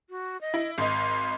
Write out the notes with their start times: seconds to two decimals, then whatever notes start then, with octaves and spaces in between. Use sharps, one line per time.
0.10 F#4
0.41 D#5
0.54 E4
0.78 G#1 D#5 C6